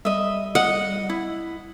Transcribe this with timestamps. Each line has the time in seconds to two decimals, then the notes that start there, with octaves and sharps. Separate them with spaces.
0.05 G3 D#5 E5
0.55 D#5 F#5
1.09 E4